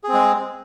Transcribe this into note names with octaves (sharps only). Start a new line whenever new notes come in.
G#3 C4 G#4